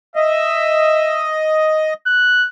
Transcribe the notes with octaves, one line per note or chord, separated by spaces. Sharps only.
D#5 E5
F#6